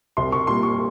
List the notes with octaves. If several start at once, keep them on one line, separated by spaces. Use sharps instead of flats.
C2 C6
C#6
A#2 G3 C6
C#6